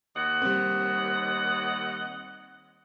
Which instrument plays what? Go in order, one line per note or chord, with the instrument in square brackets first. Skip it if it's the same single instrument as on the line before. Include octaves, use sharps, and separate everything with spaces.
[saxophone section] D#2 D#5 F#5
[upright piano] G3 C4